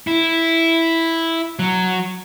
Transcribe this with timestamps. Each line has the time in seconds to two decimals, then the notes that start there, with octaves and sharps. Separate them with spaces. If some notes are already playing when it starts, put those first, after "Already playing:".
0.07 E4
1.59 F#3